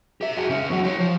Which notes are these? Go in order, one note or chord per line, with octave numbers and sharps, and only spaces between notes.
G4 E5
F#4 G#4
C#2 C#4
E2 F#3
G4 C#5
F3